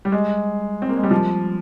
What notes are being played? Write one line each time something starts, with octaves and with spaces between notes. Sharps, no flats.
G3
G#3
C4
A#3
G#3
G3
F3